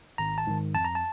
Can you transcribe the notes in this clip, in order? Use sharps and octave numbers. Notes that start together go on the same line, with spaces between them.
G#1 A#5
A5
G#2 D#3
F2 A5
A#5
A5